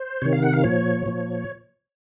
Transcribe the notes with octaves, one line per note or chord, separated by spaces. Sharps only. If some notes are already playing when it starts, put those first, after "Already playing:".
Already playing: C5
C3 D#3 C#5
F5
F#5
F5
A#2 F3 C#5
A#2 F3